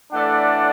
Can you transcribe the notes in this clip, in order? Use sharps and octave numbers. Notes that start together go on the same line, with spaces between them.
A2 E3 A3 D4 D5 F#5